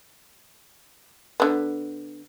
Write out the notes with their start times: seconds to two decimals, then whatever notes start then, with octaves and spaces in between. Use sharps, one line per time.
1.40 D3 B3